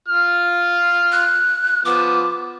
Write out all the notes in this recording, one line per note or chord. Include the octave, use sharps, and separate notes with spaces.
F4 F6
F#6
F3 B3 D6